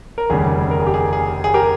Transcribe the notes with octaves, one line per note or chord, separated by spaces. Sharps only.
A#4
F1 D#2 C#3 G3 G#4
A#4
G#4
G4
G#4
G#4
G#4
G4 A#4